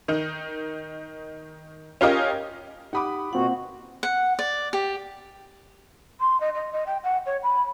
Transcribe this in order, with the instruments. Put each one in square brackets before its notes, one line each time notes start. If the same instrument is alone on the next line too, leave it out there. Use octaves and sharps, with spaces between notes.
[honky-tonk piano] D#3 D#4
C#4 F4 G4 A#4 D#5
[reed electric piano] D#4 G4 D#6 [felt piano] F#5 B5 D6
[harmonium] B2 F#4 [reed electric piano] A#3 C4 F4 [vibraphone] F#5
[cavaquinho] F#5
D5
G4
[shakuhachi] C6
D#5
D#5
D#5
G5
F#5
C#5
B5